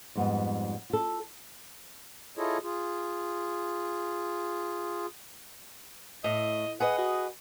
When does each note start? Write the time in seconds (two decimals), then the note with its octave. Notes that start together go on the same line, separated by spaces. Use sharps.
0.15 F2 G#2 G3 B3
0.90 F4 A4
2.37 E4 F4 G#4 A4 C#5 D#5
2.63 F4 G#4
6.24 A2 D#5
6.80 G#4 B4 D#5 F#5
6.98 F#4